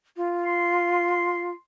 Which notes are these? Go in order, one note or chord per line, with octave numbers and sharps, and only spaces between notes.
F4
C6